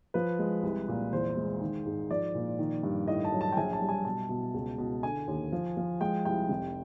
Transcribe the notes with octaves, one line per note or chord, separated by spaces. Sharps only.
F3 B4
G#3
C2
A#2
E2 C5
G#3
D#3
G#2
F3 D5
A#2
D#3
G2
A2 D#5
A5
F#3
A5
G5
A#1 G#5
A5
G3
G#5
B2 A5
B2
C#2
B2
D3 G#5
D#2
F3
F3
G#3 G5
C2 G5
F1